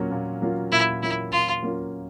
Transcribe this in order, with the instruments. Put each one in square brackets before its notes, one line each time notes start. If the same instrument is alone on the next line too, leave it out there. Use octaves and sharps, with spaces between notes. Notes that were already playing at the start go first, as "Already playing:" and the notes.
Already playing: [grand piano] A#2 F#3 A#3 C#4 F4
A#2
F#3 A#3 C#4 F4
[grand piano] A#2 [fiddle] E4
[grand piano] F#3 A#3 C#4 F4 [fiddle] E4
[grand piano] A#2 [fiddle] F4
[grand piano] F#3 A#3 C#4 F4